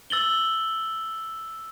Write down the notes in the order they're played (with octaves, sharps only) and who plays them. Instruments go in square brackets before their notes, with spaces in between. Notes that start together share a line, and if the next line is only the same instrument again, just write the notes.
[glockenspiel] E6 A6 F#7 G7